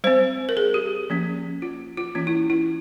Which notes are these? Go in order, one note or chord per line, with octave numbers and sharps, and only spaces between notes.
G3 C4 C5
A#4
G#4
G4
F3 A#3 C#4
F4
F4
E3 A#3 C#4 F4
E4
E4